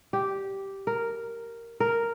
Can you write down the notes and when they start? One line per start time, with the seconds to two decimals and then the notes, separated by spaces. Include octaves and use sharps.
0.13 G4
0.87 A#4
1.80 A#4